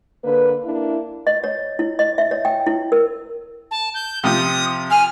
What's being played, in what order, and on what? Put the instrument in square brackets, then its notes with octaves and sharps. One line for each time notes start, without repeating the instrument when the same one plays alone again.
[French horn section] D3 A#3 B4
A#3 D4 E4
[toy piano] D#5
C#5
E4
D#5
E5
C#5
G5
E4
A#4
[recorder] A5
G6
[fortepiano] C3 F3 F4 [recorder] D#6
[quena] G#5 [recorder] F6